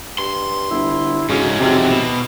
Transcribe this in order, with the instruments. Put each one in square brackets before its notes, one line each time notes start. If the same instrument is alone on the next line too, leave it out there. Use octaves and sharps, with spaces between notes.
[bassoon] G2 [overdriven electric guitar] C6
[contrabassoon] G1 [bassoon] E4
[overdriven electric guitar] G#2 C#4 [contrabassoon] C#3 [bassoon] G#3 [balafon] E4 F#4 A4
[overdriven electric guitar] F2 F#3 [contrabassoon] C3 [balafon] D#4 F#4
[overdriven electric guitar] B2